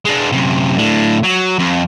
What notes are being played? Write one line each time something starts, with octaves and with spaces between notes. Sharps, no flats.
G#3 D4
F#2 C3
A2 D4
F#3
F2